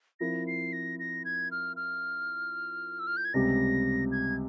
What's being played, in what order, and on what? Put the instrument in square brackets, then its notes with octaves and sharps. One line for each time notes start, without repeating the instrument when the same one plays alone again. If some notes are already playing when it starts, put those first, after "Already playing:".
[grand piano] F3 C4 E4 A#4 [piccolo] A#6
[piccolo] C7
A#6
A#6
G#6
F6
F6
E6
F6
G6
G#6
[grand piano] C#2 C3 G3 C4 G4 [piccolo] A#6
[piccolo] G#6